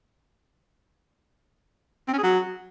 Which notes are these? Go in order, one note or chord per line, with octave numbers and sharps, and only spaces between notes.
C4
C#4
G#4
F#3